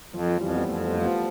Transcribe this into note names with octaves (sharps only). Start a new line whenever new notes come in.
F2 F3
F3
F2 E3 G3
C4
G3 B3
F2 A3 C4
G3 B3
F3 A3
G3 B3